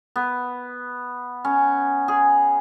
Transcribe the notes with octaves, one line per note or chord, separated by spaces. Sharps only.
B3
C#4
G#4